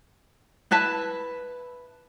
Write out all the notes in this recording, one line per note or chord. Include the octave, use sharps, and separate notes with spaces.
E4 B4 E5 A5